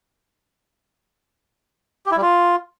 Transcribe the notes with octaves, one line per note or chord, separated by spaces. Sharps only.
G4
E4
G3
F4